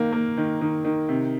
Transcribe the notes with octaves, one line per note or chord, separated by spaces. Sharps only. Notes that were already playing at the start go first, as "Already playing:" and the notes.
Already playing: D#3 A#3
A#3
D#3
D#3
D#3
C3